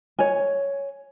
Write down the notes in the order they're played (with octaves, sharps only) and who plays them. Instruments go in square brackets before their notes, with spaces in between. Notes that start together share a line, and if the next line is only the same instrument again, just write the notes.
[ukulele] C#5 G#5